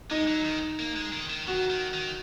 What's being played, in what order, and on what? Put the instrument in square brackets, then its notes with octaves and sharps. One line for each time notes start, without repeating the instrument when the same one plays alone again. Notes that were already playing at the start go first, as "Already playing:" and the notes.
[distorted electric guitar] G#3 [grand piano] D#4
[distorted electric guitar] F#3
D#3
A#3
G#3
D#3
D#3
[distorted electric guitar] D#3 [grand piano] F#4
[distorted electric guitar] D#3
D#3